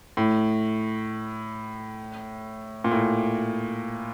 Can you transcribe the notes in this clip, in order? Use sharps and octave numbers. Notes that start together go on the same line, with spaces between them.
A2
A#2
A2